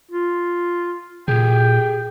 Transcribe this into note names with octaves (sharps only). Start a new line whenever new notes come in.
F4
A#2 G4 G#4 G5